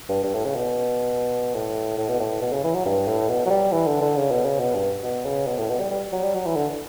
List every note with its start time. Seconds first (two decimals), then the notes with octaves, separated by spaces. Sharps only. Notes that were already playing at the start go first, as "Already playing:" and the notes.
0.09 G2
0.23 G2
0.34 A2
0.45 C#3
0.56 B2
1.54 A2
1.98 A2
2.09 B2
2.20 A2
2.41 B2
2.53 C#3
2.64 E3
2.74 F#3
2.85 G2
3.07 A2
3.29 B2
3.46 F#3
3.50 G3
3.72 E3
3.87 D3
4.01 D3
4.16 C#3
4.31 B2
4.45 C#3
4.60 B2
4.74 G2
5.03 B2
5.25 C#3
5.47 B2
5.58 A2
5.69 B2
5.80 G3
5.91 G3
6.12 F#3
6.23 G3
6.35 F#3
6.46 E3
6.56 D3